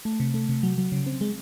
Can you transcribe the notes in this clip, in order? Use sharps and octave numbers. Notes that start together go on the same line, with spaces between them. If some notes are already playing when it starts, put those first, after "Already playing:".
A3
C3
A3
C3
F#3
F#3
C#3
C4
G#3